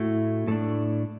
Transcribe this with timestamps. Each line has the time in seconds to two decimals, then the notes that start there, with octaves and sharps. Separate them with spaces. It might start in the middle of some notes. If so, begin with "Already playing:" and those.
Already playing: A2 A3 E4 F#4
0.48 A2 A3 D4 A4